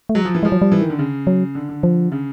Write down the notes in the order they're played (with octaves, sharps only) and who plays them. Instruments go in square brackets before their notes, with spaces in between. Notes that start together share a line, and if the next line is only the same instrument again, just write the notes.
[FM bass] A3
[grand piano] F#3 [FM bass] G#3
[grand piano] F3
E3
[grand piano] F3 [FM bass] G#3
[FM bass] F#3
G3
[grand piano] E3
D#3
D3
C#3
[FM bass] F#3
[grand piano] D3
D3
[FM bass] F3
[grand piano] C#3